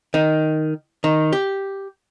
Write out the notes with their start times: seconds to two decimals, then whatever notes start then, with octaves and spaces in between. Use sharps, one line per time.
0.14 D#3
1.04 D#3
1.33 G4